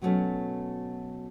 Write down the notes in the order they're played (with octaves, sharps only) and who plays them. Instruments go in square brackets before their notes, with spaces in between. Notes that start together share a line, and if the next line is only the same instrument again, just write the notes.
[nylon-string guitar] B2 F#3 G3 A3 B3 C#4